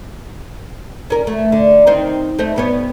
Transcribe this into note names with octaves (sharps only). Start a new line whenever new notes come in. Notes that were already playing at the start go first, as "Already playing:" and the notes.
C#4 A#4
A3
D3
D#3 C4 D#4
A3 C5 D#5
G2 B3 C#5